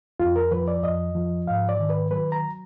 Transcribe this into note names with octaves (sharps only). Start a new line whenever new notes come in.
F2 F4
A#4
F3 B4
D5
F2 D#5
F3
G#2 F5
D5
D#3
B4
F#3 B4
A#5